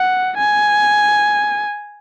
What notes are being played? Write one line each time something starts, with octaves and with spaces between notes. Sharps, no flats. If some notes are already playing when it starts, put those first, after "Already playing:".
Already playing: F#5
G#5